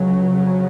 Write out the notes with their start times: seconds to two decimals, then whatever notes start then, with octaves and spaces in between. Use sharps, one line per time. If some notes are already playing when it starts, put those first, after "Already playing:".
Already playing: C#2 C#3 F#3
0.32 F2 C#3